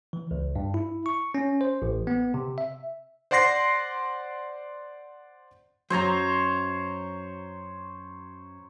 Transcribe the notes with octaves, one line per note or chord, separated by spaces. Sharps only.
E3
C#2
G2
E4
C#6
C#4
C5
A1
B3
C3
E5
C5 D5 F#5 C6 A#6 C7
F#2 F#3 C5 C#5 A#5